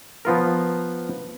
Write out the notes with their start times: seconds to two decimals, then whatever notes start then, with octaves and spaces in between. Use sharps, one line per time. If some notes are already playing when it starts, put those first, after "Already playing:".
0.25 F3 B3 F4 A#4